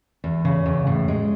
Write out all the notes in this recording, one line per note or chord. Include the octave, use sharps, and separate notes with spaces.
E2
C#3
E2
A2
G#3